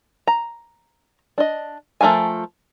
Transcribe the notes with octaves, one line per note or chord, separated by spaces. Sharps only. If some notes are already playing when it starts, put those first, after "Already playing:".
A#5
D4 D#5
F3 A3 A#4 F5 G#5